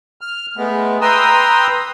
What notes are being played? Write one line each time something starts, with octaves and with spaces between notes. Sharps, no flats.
F6
G#3 A3 B3
B4 G5 A#5 C6 D#6 E6